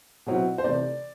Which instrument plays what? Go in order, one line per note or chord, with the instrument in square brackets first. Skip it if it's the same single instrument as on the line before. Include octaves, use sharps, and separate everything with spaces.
[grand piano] B2 F#3 C4 E4
[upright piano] C5
[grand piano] C3 E3 A3 [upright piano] D5